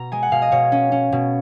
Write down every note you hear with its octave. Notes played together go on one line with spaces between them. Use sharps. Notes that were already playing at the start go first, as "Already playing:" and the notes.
Already playing: B2 A#5
G#3 G#5
F#5
B2 F5
D#5
B2 C#5
C#4
C#4
B2